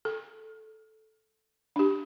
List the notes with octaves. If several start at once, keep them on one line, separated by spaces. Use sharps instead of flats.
A4
D4 G4